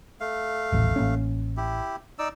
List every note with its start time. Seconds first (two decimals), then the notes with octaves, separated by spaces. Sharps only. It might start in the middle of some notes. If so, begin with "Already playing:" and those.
0.21 A3 F5
0.72 D#1 A1
0.96 A1 A#3 C#4
1.57 E4 G4
2.19 D#4 D5 E6